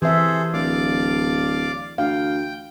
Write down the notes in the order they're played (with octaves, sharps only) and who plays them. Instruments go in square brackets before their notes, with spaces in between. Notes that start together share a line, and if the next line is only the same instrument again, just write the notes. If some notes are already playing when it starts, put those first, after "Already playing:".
[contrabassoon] C3 [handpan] E3 E5 [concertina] G#4 A4 C5
[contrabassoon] D1 [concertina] D5 F5 D6
[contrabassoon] D2 [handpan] F5 [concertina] G5